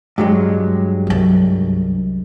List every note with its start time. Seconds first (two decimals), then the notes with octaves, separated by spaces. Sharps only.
0.18 G2 F#3 G#3
1.07 C2 F#2